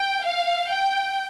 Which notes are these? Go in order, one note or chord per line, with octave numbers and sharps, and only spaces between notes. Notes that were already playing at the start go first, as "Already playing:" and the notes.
Already playing: G5
F5
G5